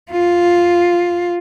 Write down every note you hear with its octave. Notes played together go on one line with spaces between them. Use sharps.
F4